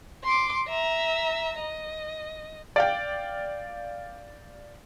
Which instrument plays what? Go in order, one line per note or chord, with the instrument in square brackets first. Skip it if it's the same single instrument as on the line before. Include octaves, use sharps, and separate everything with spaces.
[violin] C6 D6
E5 A#5
D#5
[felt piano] D5 F5 G5